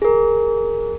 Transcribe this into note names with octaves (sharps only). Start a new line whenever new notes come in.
G#4 A#4